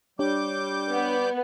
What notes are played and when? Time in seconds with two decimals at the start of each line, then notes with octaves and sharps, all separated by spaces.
0.19 G3 D4 G4 C#5 D6 G6
0.92 B3